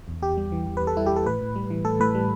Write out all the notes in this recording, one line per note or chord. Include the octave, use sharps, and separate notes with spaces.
E2
E2 G4
G3
E3
E2
B4
E2
A4
G3 E4
G4
E3 A4
A2 B4
A2
G3
E3
A2 A4
A2 B4
G3